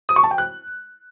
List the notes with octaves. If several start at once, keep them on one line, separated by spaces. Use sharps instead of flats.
D#6
C#6
A5
G5
F#6